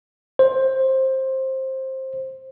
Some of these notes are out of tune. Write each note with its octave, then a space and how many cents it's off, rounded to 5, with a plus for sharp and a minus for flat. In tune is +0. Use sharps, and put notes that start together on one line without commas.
C5 +15